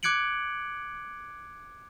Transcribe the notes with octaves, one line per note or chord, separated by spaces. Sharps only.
D6 F#6 G#6 C#7 D7 F#7